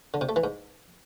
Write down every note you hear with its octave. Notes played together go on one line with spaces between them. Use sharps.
D3
C3
A3
E3
G#2